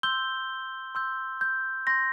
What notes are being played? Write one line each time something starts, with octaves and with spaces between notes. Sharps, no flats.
C6 E6 G6 G7
C6 E6 G6
G6
C6 G6 A#6